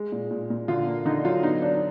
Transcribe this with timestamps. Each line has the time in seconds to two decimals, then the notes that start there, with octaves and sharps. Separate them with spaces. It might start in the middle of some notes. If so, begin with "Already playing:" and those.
Already playing: G#3
0.12 A#2
0.31 A#2
0.50 A#2
0.68 D3 F4
0.87 A#3
1.06 D3 D#4
1.25 F#3 F4
1.43 B3 D#4
1.62 D4